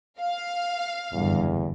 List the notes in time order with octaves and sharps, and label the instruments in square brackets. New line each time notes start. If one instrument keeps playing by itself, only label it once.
[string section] F5
[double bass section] F#1 D3 [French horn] E2 [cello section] G2